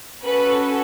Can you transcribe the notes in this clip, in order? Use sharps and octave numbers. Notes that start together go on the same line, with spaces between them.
C#4 F#4 A4 B4